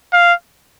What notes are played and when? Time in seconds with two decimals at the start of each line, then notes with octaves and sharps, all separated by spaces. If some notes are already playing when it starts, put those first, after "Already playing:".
0.13 F5